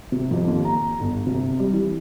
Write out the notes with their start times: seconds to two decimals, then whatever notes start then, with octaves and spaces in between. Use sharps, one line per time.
0.12 C3
0.31 F2
0.48 D#2
0.65 A#5
1.00 G1
1.27 C3
1.59 G3
1.73 E3